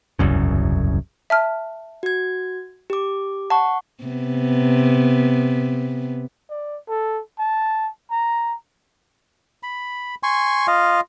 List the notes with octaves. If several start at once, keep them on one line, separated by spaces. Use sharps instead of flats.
E1 C2 F#2 C#3
E5 A5 F6
F#4 G#6
G4 D6
F#5 A5 C#6
C3 B3
D5
A4
A5
A#5
B5
G#5 C6 C#6
F4 D#5 F5